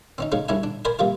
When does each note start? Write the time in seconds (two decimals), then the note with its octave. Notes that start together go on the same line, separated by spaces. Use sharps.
0.18 C4 C#4 D#4
0.32 C#3 G#3 C#4 D#4
0.48 C2 C#4 D4 E4 G#5
0.63 D4
0.85 A#4 C5 D5 G#5 B5
0.99 C3 G3 A#3 F4